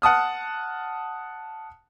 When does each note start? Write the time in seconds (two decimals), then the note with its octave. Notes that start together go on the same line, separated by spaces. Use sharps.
0.02 F#5 A5 D#6 F6